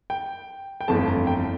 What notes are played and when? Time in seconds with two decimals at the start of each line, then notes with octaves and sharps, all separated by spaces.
0.10 G5
0.81 G5
0.88 G1 F2 E3 A3 A5
1.08 A#5
1.27 G5